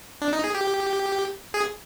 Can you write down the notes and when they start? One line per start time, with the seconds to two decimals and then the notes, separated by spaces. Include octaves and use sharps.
0.22 D4
0.33 D#4
0.44 G#4
0.54 G4
1.54 G#4